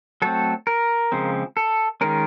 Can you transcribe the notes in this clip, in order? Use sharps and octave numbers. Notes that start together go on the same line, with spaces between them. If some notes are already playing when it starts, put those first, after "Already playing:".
F#3 A3 C4 A4
A#4
C#3 F3 G#3 C4
A4
D#3 G#3 C#4 A#4